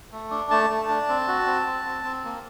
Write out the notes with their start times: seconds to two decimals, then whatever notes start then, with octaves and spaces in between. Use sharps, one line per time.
0.12 A3
0.31 D4
0.51 A3 A5
0.70 A3
0.89 D4
1.09 C4
1.28 F#4
1.46 C4
1.67 C4
1.85 C4
2.04 C4
2.24 A#3